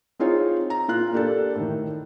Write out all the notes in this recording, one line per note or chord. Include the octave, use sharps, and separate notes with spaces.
C4 D#4 F4 G#4 C#5
A#5
A#2 F4 F#6
A#3 D4 G4 A4
A2 D#3